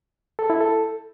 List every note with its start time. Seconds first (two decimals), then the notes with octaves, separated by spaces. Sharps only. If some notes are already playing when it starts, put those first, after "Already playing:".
0.39 A4
0.50 E4
0.61 A4